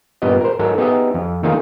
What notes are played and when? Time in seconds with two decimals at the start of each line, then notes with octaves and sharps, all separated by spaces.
0.22 G2 A#2 B3 G4 D#5
0.41 A#4 C5
0.59 G#2 F#3 G#3 A4 A#4
0.78 B3 D#4 G4 G#4 D#5 E5
1.14 F2
1.43 D#3 A3 A#3 D#4 F4 G#4